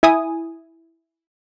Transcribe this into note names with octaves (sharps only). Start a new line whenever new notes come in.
E4 G#5 D#6